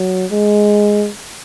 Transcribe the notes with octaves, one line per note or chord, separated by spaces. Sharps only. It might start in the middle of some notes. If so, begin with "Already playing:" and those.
Already playing: F#3
G#3